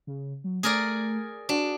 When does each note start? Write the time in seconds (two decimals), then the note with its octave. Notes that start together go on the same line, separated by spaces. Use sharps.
0.07 C#3
0.44 F#3
0.63 A3 G#4 A#4 D5
1.49 D4 F#4